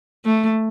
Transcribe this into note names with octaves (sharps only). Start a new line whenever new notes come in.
A3